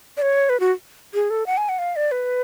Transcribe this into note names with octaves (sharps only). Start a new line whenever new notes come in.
D5
C#5
B4
F#4
G#4
A4
F#5
G#5
F#5
F5
D5
B4